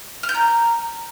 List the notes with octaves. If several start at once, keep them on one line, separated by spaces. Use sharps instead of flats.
F6
G6
A#5